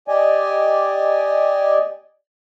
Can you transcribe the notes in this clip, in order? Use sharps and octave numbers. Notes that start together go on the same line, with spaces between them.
G4 D5 D#5 G#5